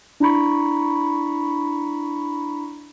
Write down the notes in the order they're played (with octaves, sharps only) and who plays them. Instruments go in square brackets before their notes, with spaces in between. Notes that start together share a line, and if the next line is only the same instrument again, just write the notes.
[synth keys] D4 E4 A#5 B5 C#6